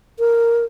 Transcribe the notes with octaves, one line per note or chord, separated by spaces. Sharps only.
A#4